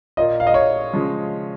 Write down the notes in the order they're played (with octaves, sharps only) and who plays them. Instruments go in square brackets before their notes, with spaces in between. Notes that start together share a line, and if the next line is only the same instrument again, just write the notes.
[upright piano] A#2 A#3 F4 [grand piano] D#5
[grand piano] F5
D#5
C#5
[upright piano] C#3 F3 G#3